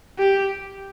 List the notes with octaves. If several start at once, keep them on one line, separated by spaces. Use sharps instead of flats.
G4